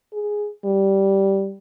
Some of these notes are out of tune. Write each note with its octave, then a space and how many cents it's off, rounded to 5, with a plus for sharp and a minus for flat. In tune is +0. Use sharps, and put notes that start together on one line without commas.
G#4 +0
G3 -10